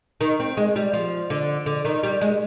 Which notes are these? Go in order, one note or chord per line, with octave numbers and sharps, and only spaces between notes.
D#3
C4
G#3
G3
F3
D3
D3
D#3
G3
G#3